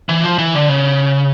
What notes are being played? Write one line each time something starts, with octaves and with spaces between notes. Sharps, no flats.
E3
F3
E3
D3
C#3